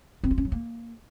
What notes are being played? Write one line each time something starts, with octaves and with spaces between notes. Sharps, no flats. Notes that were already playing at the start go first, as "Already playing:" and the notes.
C4
F4
C#4
F#3
A#3